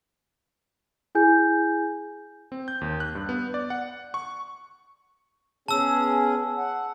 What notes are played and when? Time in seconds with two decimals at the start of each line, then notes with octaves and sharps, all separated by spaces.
1.15 E4 G#4 G#5 G6
2.52 C4
2.68 G6
2.81 D#2
3.00 F#6
3.15 G2
3.29 B3
3.54 D5
3.70 F#5
4.14 C#6
5.68 B3 C#4 G#4 A5 E6
6.57 F#5